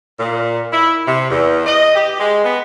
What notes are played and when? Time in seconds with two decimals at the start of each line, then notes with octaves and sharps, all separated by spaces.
0.20 A#2
0.72 E4
1.07 C3
1.30 E2
1.66 D#5
1.95 G4
2.19 G#3
2.44 B3